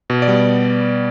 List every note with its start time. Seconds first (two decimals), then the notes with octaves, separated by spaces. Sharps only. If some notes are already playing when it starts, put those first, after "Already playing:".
0.10 B2
0.22 D5
0.28 G3 B3